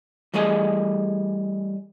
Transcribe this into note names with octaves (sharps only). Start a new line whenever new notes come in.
E3 G3 A3 G#4 D#5